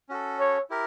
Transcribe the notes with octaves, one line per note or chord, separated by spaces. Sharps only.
C#4 F#4 A4
C#5
E4 G4 A#4